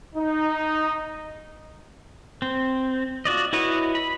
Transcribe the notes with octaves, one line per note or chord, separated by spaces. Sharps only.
D#4
C4
F4 F#4 D5 D#5
E4 F#4 B4 C#5 D#5
B5